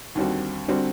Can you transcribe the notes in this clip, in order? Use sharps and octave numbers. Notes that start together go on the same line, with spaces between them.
D#2 D3 G3 C4 F#4
D3 G3 C4 F#4